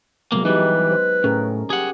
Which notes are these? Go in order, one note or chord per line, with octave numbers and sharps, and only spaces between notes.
C2 F#3 G#3 A#3 B3
E3 G3 D#4 G4 B4
C5
A2 C#4 G#4 A#4
G4 G#4 F#5